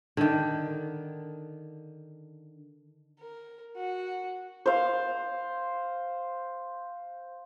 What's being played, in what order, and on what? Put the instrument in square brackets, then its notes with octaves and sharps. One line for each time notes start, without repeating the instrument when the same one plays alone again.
[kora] D3 D#3
[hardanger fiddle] A#4
F#4
[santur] C5 F5